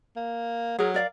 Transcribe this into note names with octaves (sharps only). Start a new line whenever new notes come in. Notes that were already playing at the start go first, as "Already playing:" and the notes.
A#3
F#3 G#4 A#4
A#4 D5 F5